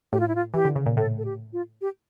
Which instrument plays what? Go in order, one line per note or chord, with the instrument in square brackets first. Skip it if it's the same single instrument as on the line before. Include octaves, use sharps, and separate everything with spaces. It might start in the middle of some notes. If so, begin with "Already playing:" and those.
[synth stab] A2 [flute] G4
[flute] F4
E4
F4
[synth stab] E3 [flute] G4
[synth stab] D3
C#3
A#2
[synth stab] A2 [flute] A4
[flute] A4
G4
F4
G4